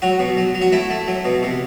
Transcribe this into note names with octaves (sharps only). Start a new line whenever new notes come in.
F#3 F#4
B2
F#3
F#3
F#4
A3 E4
A3
F#3
B2
C3